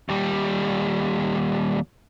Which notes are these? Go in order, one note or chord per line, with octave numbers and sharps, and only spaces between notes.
D#2 G3